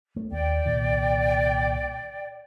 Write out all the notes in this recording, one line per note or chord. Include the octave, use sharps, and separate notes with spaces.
A3
D#2 D5 G5
C2 A#2 D#3